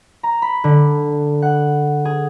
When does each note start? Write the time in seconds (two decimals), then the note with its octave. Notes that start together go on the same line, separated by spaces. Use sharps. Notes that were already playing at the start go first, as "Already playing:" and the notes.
0.23 A#5
0.42 B5
0.64 D3
1.42 F#5
2.05 G#4